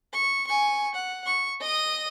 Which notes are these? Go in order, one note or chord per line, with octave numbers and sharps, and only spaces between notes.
C#6
G#5 C#6
F#5
C#6
D#5 D#6